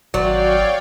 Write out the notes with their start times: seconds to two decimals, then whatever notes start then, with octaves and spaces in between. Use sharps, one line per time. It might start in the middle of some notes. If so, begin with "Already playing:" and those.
0.14 G#1 F#3 C#5 D5 F5 G5